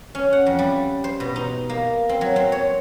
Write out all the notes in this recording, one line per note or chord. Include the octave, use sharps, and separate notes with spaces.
C#4
F#5
F2
G3
C5
B2
D#4
A#3
C4
F#3
C4
C#5